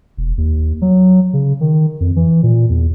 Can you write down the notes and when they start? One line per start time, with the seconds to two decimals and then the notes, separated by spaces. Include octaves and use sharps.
0.17 E1
0.38 D#2
0.82 F#3
1.33 C#3
1.61 D#3
2.00 F2
2.16 E3
2.43 A#2
2.70 E2